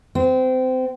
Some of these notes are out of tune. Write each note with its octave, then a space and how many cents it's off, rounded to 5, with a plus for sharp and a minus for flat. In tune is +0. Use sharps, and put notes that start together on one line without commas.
C4 -25